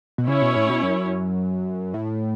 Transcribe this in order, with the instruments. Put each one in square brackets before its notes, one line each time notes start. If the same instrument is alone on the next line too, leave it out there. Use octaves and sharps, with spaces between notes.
[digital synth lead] B2
[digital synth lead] C#3 [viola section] C#4 E4 C#5
[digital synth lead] B2
A2
B2
F#2
A2